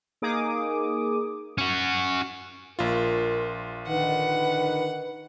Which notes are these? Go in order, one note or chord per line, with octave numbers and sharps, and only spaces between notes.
A#3 D#4 G#4 D6 D#6
C#4 F#4
A#1 F4 A#4
D3 D#3 B4 F#5